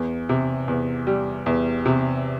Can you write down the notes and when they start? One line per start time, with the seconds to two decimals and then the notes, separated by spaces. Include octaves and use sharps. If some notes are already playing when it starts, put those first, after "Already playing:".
Already playing: E2
0.29 C3
0.68 E2
1.07 G3
1.46 E2
1.86 C3